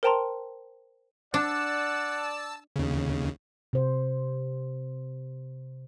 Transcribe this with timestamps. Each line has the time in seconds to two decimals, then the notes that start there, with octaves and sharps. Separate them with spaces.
0.03 A#4 C5 G5 A5 A#5 C6
1.34 D4 D5 F#5 A5 E6
2.76 D#2 C#3
3.73 C3 C5